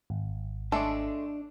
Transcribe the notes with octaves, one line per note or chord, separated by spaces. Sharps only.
G#1
G#3 A3 D4 A4 D5